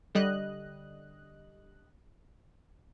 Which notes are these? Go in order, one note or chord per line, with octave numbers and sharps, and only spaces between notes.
D3 G3 D#5 F#6